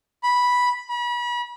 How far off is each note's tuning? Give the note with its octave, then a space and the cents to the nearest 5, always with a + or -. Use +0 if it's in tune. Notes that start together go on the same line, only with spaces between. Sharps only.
B5 -5
B5 -35